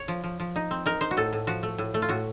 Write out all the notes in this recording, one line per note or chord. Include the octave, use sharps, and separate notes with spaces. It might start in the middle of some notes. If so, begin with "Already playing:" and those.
Already playing: C#5
F3
F3
F3
D#4
C4
D#4 A#4
D#4 C5
F#4
A2 A4
A2
F3 F#4
A3
A2
A3
F4
A2 F#4